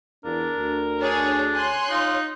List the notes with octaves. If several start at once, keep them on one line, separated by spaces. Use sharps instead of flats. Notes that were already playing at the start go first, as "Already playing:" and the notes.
E2 D4 A#4
D2
D4 G#4 C#5
C#5 G#5 C6 F#6
D#4 F4